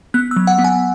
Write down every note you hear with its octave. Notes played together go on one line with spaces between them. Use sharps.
B3 F#6
E6
F#3
F#5
B3
G#5